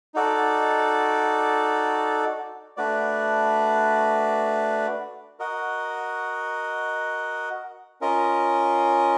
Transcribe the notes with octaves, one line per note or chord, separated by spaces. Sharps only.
D#4 F#4 A4 D5
A3 D4 F#4 B4 D5
F#4 A#4 D#5 F#5
C#4 F4 A#4 D#5